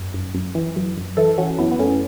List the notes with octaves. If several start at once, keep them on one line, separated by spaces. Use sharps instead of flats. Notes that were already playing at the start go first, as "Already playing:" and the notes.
Already playing: F#2
F#2
F#2
E3
F#2
F#2
E3 E4 A4
E3 C#4 F#4
F#2 B3 E4
B3
F#2 A3 C#4